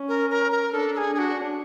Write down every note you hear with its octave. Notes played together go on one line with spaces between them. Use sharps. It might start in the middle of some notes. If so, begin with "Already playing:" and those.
Already playing: C#4
A#4
A#4
A#4
D4 A4
A4
G#4
D4 F#4 G#4